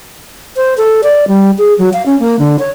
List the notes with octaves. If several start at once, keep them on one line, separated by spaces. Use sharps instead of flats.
C5
A4
D5
G3
G#4
F#3
F5
C#4
A#3
D3
C#5